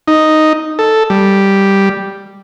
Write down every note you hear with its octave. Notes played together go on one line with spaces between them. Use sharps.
D#4
A4
G3